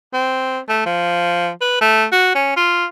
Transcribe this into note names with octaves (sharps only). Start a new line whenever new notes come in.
C4
A3
F3
B4
A3
F#4
C#4
F4